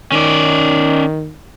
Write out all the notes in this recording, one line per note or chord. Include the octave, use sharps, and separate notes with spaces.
D#3 C#4 D5